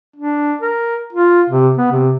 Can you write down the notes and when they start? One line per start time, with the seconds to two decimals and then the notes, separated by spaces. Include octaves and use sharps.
0.16 D4
0.62 A#4
1.13 F4
1.50 C3
1.78 B3
1.91 C3